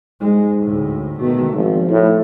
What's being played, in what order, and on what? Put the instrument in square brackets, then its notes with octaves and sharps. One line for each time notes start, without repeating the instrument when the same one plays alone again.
[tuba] G#2 [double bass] G#3
[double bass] D2 A2
[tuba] B2 [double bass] D#3 A3
[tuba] G#1 [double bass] F3
[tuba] A2